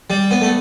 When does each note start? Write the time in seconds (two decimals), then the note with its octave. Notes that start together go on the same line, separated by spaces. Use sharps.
0.10 G3
0.31 B3
0.41 A3